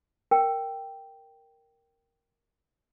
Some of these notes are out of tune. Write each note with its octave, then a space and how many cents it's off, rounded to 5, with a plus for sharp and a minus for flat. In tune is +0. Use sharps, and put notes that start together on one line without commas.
A#4 +0 G5 +0